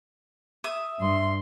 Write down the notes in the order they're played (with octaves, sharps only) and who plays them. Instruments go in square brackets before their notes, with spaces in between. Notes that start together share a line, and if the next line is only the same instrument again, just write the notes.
[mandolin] E5 D#6
[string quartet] G2 C6